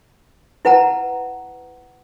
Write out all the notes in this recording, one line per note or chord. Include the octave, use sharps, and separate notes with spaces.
E4 B4 F#5 A5 A#5